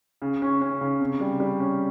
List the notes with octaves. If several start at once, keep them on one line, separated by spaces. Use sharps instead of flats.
C#3
C#4
C#4
C#3
C3
G3
G3
C#4